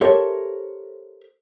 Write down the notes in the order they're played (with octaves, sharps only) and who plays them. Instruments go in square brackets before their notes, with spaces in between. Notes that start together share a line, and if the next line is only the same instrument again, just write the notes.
[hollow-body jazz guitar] G4 A4 A#4 C5 C#5 E5